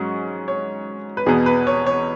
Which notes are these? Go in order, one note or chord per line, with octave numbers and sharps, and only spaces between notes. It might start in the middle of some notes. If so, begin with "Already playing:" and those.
Already playing: G#2 F#3 C#4 C#6
C#5
B4
E2 B2 B3 G#4
B4
C#5
C#5